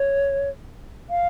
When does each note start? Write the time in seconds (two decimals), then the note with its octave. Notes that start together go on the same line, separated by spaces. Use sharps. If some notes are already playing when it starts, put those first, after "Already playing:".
Already playing: C#5
1.10 F5